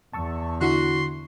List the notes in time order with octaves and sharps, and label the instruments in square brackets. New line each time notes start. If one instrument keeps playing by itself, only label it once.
[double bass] E2 [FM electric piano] A5 C#6 E6
[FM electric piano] D3 E4 [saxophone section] F#4 [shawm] C6